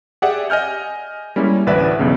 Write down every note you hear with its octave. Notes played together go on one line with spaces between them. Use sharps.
G4 G#4 D5 E5 F#5
D#5 G#5 F6 G6
G3 G#3 A#3 C#4 E4
A1 D2 B4 D5 E5
B1 E2 C#3